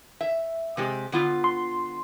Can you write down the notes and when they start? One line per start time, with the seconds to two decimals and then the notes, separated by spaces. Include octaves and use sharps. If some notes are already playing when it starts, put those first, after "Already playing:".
0.21 E5
0.77 C3 G#3 G4
1.12 D3 B3 F4
1.44 C6